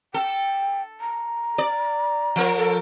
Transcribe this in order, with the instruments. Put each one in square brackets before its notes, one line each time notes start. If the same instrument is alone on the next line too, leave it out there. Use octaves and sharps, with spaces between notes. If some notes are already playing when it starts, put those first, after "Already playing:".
[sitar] A4 [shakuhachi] G5
[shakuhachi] A#5
[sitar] D5
F3 A#4
[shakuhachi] A4